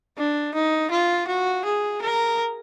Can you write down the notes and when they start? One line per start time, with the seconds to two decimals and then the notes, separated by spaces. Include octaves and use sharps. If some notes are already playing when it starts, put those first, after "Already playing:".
0.18 D4
0.54 D#4
0.90 F4
1.27 F#4
1.65 G#4
2.02 A#4